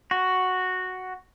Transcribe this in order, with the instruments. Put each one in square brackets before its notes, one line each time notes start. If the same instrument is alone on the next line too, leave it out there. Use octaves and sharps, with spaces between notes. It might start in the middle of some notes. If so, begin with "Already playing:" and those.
[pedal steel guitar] F#4